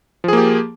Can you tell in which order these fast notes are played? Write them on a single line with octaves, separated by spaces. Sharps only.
F3 G#4 A#3 G4